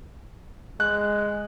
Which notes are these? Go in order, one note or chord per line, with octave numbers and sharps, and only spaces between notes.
G#3 F#6